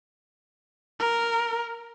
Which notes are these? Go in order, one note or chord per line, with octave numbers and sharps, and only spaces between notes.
A#4